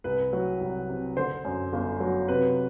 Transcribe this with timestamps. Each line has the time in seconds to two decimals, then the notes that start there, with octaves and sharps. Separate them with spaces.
0.04 C2 B4
0.33 F#3
0.61 C2
0.89 C3
1.17 D3 C5
1.45 F#2
1.73 G1
2.00 F#3
2.28 C3 B4